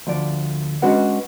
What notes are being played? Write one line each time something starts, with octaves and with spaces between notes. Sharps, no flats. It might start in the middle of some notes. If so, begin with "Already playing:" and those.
D2 F3 D5
G#3 C#4 D4 F#4 B4 F#5